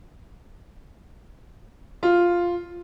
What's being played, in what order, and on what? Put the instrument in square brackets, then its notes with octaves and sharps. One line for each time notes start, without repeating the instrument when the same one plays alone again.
[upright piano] F4